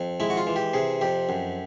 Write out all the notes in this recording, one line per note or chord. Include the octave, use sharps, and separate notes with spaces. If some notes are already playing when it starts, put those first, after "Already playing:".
Already playing: F2
G#3 E4
F#4
F4
E3
G4
C3 G#4
F2 G4
F#2